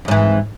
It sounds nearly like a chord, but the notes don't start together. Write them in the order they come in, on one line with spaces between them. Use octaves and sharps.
F2 G#2 E3